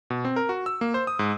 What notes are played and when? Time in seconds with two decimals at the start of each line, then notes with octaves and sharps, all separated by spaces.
0.10 B2
0.25 C4
0.36 A#4
0.49 F#4
0.66 E6
0.81 A#3
0.94 C5
1.07 D#6
1.19 G#2